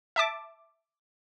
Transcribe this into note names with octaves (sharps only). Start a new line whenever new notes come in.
E5 A5 D6